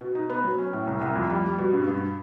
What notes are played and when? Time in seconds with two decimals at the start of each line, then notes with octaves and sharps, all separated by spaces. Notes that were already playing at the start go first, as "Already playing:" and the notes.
0.01 B2
0.15 D#4
0.30 B3
0.44 F#3
0.58 C#4
0.73 A2
0.87 C2
1.01 C2
1.16 F2
1.30 G3
1.45 G3
1.58 B2
1.73 G2
1.88 G2